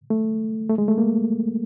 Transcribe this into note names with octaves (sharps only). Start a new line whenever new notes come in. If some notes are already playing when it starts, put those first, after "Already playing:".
A3
A3
G#3
A3
A#3